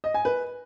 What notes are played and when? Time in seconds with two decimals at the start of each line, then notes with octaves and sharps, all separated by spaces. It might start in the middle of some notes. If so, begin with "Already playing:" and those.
0.04 D#5
0.14 G#5
0.25 B4